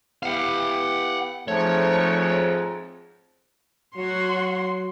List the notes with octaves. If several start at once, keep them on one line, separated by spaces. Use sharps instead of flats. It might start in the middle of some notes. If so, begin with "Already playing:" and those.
B3 E4 G4 F5 F#5
F2 G#2 F3 A3 C#5
F#3 F#4 C#5 C6